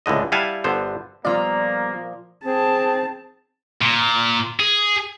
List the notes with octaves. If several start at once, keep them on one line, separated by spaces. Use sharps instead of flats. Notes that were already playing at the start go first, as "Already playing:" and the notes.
C#2 A2 D3 D#5
G3 E4 F5 F#5 G#5 A5
G1 D3 B3 C5
A#2 F3 G3 A#3 B3 F4 D5 A#5
C4 G#4 A5
A#2
G#4